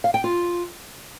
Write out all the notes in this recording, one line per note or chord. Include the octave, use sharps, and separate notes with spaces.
F5
G5
F4